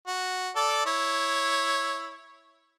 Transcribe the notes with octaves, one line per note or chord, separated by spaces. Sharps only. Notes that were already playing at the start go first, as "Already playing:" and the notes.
F#4
A4 D5
E4 C#5